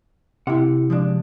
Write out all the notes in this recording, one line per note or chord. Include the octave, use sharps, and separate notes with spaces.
C3 E4 F#5
F3 G#3 D4